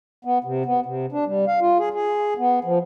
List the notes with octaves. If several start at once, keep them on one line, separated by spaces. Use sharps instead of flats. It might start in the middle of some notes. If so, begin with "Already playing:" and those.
B3
C3
B3
C3
D4
G3
F5
F4
G#4
G#4
B3
F3